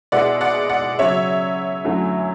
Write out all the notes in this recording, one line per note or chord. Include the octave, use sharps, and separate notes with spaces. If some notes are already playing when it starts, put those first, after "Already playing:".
B2 G#3 B3 E4 D5 F#5
D5 F#5
D5 F#5
C#3 F#3 C#4 C#5 E5
F#2 D3 F#3 A3 E4